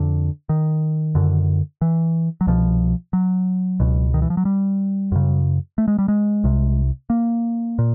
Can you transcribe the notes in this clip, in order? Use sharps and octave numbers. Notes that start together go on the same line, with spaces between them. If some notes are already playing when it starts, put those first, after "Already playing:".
Already playing: F2 D3
D#3
F#2 D3
E3
F#3
C2 B2 F3
F#3
C#2 B2
D#3
E3
F3
F#3
G3
F#2 C#3
A3
G#3
G3
G#3
C2 C3
A#3
A#2